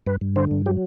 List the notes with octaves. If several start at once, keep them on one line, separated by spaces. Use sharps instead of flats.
G2 B4
G2
D3 C5
G2
F#3 G4